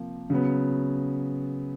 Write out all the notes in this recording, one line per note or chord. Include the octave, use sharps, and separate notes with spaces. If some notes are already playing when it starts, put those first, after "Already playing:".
Already playing: C3 F3 A#3
C#3 F#3 B3